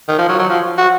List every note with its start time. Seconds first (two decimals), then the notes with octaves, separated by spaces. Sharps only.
0.08 D#3
0.18 F3
0.29 F#3
0.39 F#3
0.49 F3
0.78 F#4